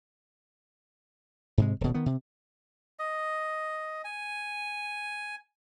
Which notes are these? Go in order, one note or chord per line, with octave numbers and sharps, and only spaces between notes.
G#2 C3 G#3
D#1 B2
D#3 B3
C3
D#5
G#5